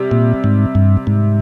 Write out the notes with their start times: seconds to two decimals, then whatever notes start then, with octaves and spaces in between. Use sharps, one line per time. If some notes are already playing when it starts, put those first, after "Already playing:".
Already playing: C3 G3
0.11 A#2
0.44 G#2
0.75 G2
1.07 G#2